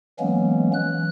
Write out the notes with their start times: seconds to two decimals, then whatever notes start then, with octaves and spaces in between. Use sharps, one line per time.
0.20 E3 F#3 G#3 A#3 B3 C#4
0.74 E3 F#6